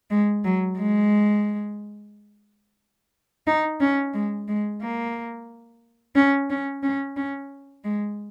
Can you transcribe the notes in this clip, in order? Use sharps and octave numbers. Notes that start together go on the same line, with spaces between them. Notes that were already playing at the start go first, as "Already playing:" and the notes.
G#3
F#3
G#3
D#4
C#4
G#3
G#3
A#3
C#4
C#4
C#4
C#4
G#3